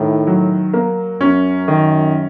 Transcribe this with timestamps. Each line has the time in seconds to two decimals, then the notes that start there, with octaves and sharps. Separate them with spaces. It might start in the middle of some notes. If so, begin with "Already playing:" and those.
Already playing: A2 D#3
0.27 F#3
0.74 A#3
1.21 F#2 C#4
1.68 D#3